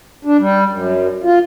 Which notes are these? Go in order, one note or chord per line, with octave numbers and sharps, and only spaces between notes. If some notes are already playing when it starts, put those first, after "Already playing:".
D4
G3
F#2
F4